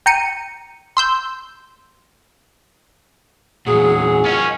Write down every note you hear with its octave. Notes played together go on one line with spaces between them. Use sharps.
G5 A#5 C#7 D#7
C6 E6 G6
E2 A#2 F#3 G#3 G#4
C#4 F4 A#4 D#5